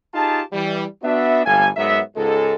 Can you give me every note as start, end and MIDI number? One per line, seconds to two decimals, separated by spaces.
0.14 0.42 63
0.14 0.42 65
0.14 0.42 67
0.14 0.42 68
0.14 0.42 81
0.53 0.84 52
0.53 0.84 55
1.03 1.44 59
1.03 1.44 62
1.03 1.44 66
1.03 1.44 76
1.45 1.68 31
1.45 1.68 45
1.45 1.68 55
1.45 1.68 69
1.45 1.68 77
1.45 1.68 80
1.76 2.00 44
1.76 2.00 54
1.76 2.00 59
1.76 2.00 70
1.76 2.00 76
2.16 2.56 37
2.16 2.56 44
2.16 2.56 56
2.16 2.56 69